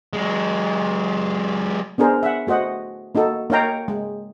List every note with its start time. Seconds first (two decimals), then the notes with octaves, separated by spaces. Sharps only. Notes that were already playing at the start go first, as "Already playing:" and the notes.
0.13 F#3 G#3
1.98 B3 D4 G#4 A#4 C5
2.23 E5 F#5
2.47 A3 F#4 C5 D#5 F#5
3.15 A#3 D#4 F#4 A4
3.50 A#3 D#4 C#5 F5 G5 A#5
3.88 G#3